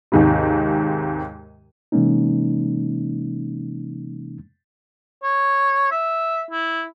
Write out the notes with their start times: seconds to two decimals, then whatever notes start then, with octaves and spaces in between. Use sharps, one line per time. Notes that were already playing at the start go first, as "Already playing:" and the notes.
0.12 D#2 G#2 C3
1.92 C3 E3 G#3 A#3 C#4 D#4
5.23 C#5
5.91 E5
6.51 E4